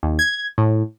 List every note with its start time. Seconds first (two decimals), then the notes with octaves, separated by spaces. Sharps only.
0.03 D#2
0.19 G#6
0.58 A2